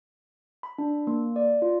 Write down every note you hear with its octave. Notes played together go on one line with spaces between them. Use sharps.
B5
D4
A#3
D5
F4